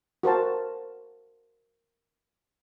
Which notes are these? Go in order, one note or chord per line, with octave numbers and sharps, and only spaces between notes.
F#4 A#4 C5 A5